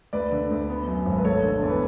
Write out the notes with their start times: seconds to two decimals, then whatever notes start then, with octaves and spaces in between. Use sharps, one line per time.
0.13 D2 B4 D5
0.32 D3
0.51 D2
0.69 B3
0.88 F#2
1.06 G#1
1.18 B4
1.25 A3 A4 C#5
1.43 D3
1.62 E2
1.70 B4